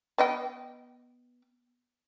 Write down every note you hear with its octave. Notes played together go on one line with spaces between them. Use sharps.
B3 D#5 G5